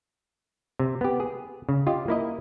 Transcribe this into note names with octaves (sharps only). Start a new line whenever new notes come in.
C3
B3 G4
G#4
C#3
F4 G4 D#5
A#3 E4 D#5